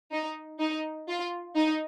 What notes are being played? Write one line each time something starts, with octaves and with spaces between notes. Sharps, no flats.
D#4
D#4
F4
D#4